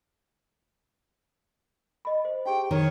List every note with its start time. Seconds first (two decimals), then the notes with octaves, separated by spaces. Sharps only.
2.05 D#5 B5
2.25 C5
2.46 D#4 G4 G#4 G5
2.71 D#3 C#5